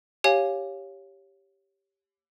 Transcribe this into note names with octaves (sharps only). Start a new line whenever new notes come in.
G4 C#5 F5 G#5